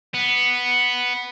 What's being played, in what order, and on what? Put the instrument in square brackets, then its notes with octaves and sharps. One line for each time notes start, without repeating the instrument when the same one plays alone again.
[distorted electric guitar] B3